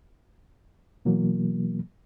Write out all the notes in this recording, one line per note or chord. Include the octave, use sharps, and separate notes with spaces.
B2 E3 F#3 A#3